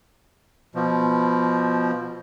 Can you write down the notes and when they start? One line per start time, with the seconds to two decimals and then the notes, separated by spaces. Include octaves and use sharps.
0.75 B2 F3